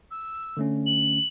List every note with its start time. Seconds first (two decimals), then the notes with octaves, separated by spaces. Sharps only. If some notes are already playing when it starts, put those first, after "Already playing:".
0.11 E6
0.57 D3 A3 C#4
0.86 F#7